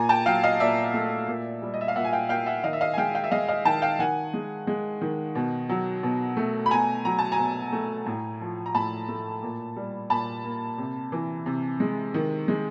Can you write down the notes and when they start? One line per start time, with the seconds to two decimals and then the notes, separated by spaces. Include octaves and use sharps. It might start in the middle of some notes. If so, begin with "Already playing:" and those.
Already playing: A#2 G#5 A#5
0.09 G5 A5
0.26 F#3 F5 G5
0.43 D#5 F5
0.60 A#2 D5 E5
0.94 A3
1.28 A#2
1.62 G3
1.74 D#5
1.81 E5
1.88 F5
1.96 A#2 E5 F#5
2.05 G#5
2.13 F5 G5
2.29 A#3 F5 G5
2.46 E5 F#5
2.64 D#3 D#5 F5
2.73 E5
2.81 D#5 F5
2.94 G#5
2.98 G#3 F5 G5
3.15 F5 G5
3.24 E5
3.31 G#3 D#5 F5
3.48 D#5 F5
3.65 D#3 G5 A5
3.82 F5 G5
3.99 D#3 F#5 G#5
4.34 G#3
4.67 G#3
5.01 D#3
5.35 B2
5.69 F#3
6.03 B2
6.37 A3
6.66 B5
6.71 B2 G#5 A#5
7.05 F#3 A#5
7.19 A5
7.32 G#5 A#5
7.39 B2
7.73 A3
8.06 A2
8.41 F3
8.66 A#5
8.75 A2 A5 B5
9.08 A3
9.43 A#2
9.76 G3
10.10 A#2 A5 B5
10.44 A#3
10.78 C3
11.12 E3
11.46 C3
11.80 G#3
12.14 D#3
12.48 G#3